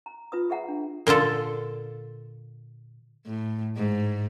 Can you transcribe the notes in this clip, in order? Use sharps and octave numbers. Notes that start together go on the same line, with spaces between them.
A#5
F4 B4 D#6
G#4 E5 F#5 A#5
D4
A#2 D3 F4 A4
A2
G#2